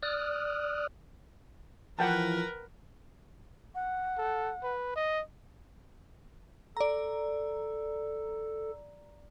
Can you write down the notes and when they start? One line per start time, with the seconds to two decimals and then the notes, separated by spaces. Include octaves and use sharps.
0.03 D5 D#6 F6 F#6
1.99 E3 F3 A#4 B4 F#5 G5 A5
3.75 F#5
4.18 A4
4.63 B4
4.96 D#5
6.77 A4 D5 A#5